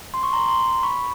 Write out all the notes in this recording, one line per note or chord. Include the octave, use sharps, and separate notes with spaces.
C6
C#6
A#5 C6
A#5 C6
B5 C#6